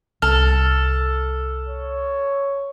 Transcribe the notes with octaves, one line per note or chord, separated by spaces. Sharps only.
C2 A4 F6
C#5